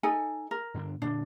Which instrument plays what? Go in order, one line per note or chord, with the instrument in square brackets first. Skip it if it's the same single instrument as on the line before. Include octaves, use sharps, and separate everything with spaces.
[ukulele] D#4 A4 G#5
A#4
[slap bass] G2 D3 D4
[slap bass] A#2 D3 A#3 [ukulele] D4